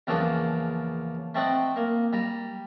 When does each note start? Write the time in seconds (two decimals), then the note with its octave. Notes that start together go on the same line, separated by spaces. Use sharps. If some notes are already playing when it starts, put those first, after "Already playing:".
0.07 E2 C#3 F3 A#3 D4 D#6
1.35 A3 C4 D5 D#5 F#5
1.76 A#3
2.13 G3 A#5